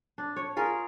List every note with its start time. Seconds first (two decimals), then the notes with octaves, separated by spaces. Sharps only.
0.18 D4
0.36 C#5
0.56 F4 G#4 A#4